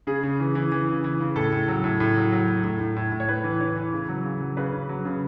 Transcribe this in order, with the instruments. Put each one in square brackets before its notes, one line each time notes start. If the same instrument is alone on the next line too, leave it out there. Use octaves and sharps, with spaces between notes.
[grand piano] C#3 G#4
C#3
E3
E3
E3
C#3
E3
C#3
A2 A4
A2
F#3
A2
A2
F#3
F#3
F#3
A2
A2
A2
A2
C#5
A2 B4
E3
E3 C#5
E3
C#3
F#3
C#3
F#3
C#3 B4
C#3
F#3
C#3